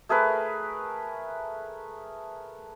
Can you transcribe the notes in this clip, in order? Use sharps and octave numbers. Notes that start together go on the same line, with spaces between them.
A3 G#4 A#4 B4